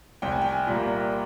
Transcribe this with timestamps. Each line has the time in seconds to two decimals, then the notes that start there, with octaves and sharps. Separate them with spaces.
0.22 C2 G5
0.32 G#5
0.41 G5
0.52 G#5
0.67 A#2 G3 A#3